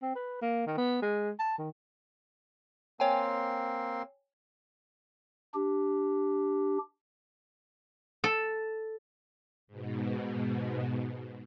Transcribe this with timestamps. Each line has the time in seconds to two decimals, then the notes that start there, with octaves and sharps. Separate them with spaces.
0.02 C4
0.15 B4
0.41 A#3
0.66 D#3
0.78 B3
1.02 G#3
1.39 A5
1.58 D#3
3.00 A#3 C4 C#5 G5 G#5 C6
5.54 D4 G4
8.24 A4
9.67 G#2 B2